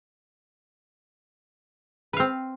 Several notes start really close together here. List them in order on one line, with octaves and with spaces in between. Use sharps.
B4 F5 C4